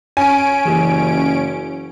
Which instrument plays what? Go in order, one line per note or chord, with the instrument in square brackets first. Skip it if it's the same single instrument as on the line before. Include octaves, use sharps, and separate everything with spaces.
[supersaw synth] C#4 D7 [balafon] C#5 [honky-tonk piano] G#5
[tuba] F#1 [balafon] E3 G4